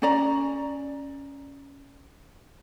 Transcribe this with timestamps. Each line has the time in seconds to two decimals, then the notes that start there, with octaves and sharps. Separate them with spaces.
0.02 C#4 D5 A#5